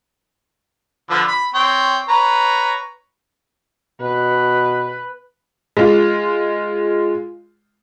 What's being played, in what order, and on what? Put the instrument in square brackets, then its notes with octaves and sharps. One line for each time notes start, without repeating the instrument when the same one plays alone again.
[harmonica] D3 F3 B4
B5
C4 C#5 G5
B4 C#5 A#5
[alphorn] B2 [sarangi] B4
[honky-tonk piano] G#3 F4